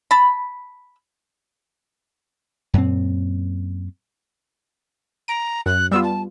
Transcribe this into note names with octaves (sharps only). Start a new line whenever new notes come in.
A5 B5
F#2 A#2 C4
A#5 D7
F#2 F#6
G3 B3 F4 E6
A5